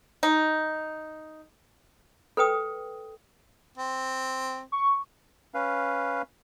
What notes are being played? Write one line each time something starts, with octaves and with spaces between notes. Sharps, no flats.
D#4
A4 B4 G5 D#6
C4
C#6
C#4 B4 F5